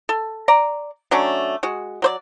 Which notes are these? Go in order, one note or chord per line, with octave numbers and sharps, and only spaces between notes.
A4
D5 A#5
F#3 A3 C#4 D4
G#3 F#4
F#3 C5 D5